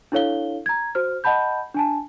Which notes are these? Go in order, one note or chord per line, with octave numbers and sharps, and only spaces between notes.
D4 E4 A4 C#5 F5 G7
A#5 G#6
F#4 C5 F6
D#5 F#5 A5 B5 G6
D4 G#5 A5